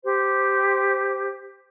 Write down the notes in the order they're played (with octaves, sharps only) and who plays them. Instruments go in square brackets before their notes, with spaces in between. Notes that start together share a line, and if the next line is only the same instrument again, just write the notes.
[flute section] G4 C5